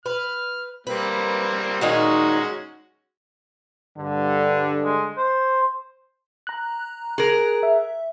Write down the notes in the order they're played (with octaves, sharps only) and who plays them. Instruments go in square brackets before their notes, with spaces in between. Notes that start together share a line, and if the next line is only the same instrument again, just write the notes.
[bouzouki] B4 [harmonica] F6
[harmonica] G3 A#3 C4 [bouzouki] B4
[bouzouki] A#2 D#3 D#4 [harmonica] G#3 C#4 F#4
[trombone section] G2 D3
[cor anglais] G#3
C5
[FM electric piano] A#5 F#6
[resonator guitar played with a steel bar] G#4 A#4
[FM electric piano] E5